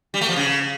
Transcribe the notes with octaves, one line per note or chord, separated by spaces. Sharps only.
G3
A3
F3
C#3